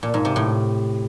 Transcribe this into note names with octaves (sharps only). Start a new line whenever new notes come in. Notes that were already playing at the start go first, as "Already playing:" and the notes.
A#2
G#2
C3
A2